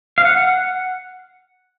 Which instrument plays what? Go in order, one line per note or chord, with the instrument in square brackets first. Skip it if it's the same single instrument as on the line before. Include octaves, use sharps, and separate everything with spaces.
[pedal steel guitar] F5
F#5